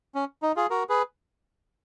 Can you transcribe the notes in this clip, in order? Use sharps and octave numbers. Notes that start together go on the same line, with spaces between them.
C#4
D#4
F4 G#4
F#4 A#4
G#4 B4